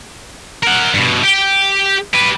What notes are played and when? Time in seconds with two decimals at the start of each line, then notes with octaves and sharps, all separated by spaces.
0.63 A#4 F#5
0.94 G2 B2
1.23 G4 G5
2.13 G4 B4